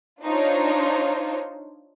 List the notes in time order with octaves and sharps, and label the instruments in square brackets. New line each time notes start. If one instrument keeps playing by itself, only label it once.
[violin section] D4 D#4 F4 C5 C#5